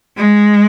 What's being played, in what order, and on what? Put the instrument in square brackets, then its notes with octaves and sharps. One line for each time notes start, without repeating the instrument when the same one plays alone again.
[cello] G#3